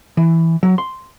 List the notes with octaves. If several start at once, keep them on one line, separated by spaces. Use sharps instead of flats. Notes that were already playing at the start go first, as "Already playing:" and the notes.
E3
F#3
C6